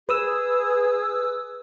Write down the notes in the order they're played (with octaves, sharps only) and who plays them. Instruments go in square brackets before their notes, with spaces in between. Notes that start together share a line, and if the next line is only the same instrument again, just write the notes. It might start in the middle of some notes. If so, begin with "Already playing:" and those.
[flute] G#4 [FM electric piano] B4 D#6 E6